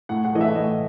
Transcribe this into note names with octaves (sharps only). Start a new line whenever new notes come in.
A2 F#5
F#5
E3 A3 D#5
E5
A2 D#5